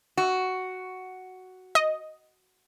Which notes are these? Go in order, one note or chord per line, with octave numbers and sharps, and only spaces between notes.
F#4
D#5